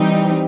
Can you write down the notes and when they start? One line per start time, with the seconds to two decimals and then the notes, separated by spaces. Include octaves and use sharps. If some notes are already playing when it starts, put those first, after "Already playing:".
Already playing: E3 G3 C4 D#4 G4